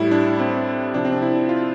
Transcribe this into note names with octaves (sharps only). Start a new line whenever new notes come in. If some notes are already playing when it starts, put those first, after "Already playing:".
Already playing: A2 G3 E4
D4
C4
C3 F3 D4
C4
D4
E4
F4